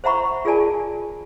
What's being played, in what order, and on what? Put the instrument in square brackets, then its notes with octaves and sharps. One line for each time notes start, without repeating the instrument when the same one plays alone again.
[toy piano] C5 E5 F#5 A#5 B5 C#6
F4 G#4 A#4 D5 G#5 A5